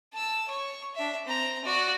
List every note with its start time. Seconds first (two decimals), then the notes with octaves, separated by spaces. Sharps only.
0.13 A5 E6
0.48 C#5 C#6
0.95 D4 E5
1.26 C4 A#5
1.64 F#4 D5